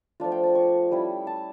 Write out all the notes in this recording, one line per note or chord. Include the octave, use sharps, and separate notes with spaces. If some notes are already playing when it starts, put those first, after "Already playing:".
F3 A3 D4 F4 F5
G5
A5
C#6
G3 C#4 E4
A5